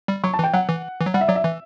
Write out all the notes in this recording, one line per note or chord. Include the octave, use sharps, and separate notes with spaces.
G3
F#3 C#6
A5
E3 G5
F#3 F#5
E3
E3
F#3
G3 F#5
E5
F#3 D5
E5
E3